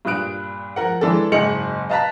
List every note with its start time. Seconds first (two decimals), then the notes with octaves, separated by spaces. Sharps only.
0.05 G2 A#2 D#6 F#6 D7
0.76 F3 A#4 F#5
1.01 E3 G#3 D4 A4
1.32 F#1 G#2 G#4 D#5 C#7 F#7
1.90 D#5 F5 A5 A#5 F#6 B6